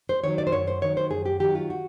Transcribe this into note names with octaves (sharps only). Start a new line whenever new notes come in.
C5
D#3 F#3 C#5
D5
C5
F#2 C#5
C5
D#3 F#3 C#5
C5
F#2 G#4
G4
D#3 F#3 G4
F4
F#4